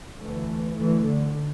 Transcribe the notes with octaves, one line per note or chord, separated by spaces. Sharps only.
D2 E3 A3
D2 E3 A3
D3